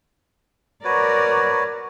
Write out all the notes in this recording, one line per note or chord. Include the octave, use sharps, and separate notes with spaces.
F#4 A#4 B4 C#5 D5